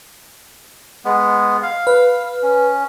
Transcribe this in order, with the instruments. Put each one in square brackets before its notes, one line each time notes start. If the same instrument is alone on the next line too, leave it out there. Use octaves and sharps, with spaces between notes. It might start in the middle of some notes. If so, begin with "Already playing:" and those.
[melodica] G#3 B3
F5
[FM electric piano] B4
[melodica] C#4